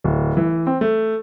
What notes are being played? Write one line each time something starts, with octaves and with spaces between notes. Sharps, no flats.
D1
E3
C4
A3